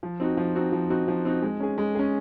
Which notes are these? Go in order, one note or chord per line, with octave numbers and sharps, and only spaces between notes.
F3
C4 D#4 F#4
F3
C4 D#4 F#4
F3
C4 D#4 F#4
F3
C4 D#4 F#4
G#3
C#4 G#4
G#3
C#4 G#4